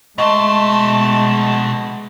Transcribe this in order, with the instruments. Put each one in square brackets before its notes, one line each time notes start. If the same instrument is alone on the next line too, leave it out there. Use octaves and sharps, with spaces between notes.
[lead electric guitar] B2 C6 [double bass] G#3 [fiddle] A3 A5 [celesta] D#5 C#6